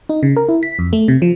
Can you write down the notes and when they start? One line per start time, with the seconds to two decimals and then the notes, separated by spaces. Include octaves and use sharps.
0.09 D#4
0.23 C#3
0.36 A#4
0.49 E4
0.63 B6
0.79 F2
0.93 A3
1.08 C3
1.22 F3